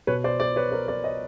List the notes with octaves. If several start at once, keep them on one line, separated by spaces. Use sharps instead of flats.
B2 B4 C#5
C5 D5
C5 D5
B4 C#5
A#4 C5
C5 D5
C#5 D#5